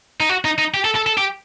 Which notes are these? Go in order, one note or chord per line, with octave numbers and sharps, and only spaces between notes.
D#4
F#4
D#4
D#4
G4
A4
A4
A4
G4